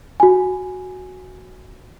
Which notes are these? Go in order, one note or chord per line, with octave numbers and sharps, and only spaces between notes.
F#4 G#5